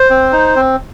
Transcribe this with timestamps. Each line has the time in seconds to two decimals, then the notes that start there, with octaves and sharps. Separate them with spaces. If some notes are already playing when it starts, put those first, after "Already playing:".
Already playing: C5
0.10 C4
0.33 D#4
0.56 C4